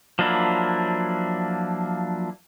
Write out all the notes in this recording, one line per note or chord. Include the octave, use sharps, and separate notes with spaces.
F3 F#3 A#3 D4 E4